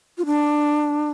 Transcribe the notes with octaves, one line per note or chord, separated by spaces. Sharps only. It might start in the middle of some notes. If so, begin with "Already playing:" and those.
F4
D4